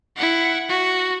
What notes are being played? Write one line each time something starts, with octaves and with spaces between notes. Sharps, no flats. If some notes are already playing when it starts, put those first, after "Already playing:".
E4 F#5
F#4